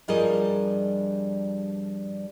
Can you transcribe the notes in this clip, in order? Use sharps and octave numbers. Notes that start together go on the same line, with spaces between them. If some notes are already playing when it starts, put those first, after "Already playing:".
G2 F3 G3 G#4 A#4 D#5